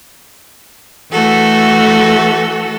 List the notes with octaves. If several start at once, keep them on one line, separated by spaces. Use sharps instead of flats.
E3 A3 F#4 A4